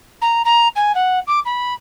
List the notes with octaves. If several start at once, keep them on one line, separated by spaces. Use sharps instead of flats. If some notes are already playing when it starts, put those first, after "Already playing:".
A#5
A#5
G#5
F#5
D6
B5